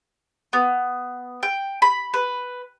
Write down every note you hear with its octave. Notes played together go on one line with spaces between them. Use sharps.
B3
G5
B5
B4